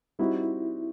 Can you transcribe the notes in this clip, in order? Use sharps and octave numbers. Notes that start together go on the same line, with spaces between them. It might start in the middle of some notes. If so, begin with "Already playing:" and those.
G3 C4 D#4 E4 F#4